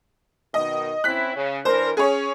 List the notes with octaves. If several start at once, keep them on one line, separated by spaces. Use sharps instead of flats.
B2 D#3 D#5
C4 C#4 E4 F#6 B6
C#3
E3 D4 A#4 C5
C#4 G#4 C#5